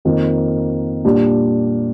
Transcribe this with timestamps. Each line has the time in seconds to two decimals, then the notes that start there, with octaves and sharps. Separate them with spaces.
0.05 F2 D#3 A#3
1.05 A#2 G3 D4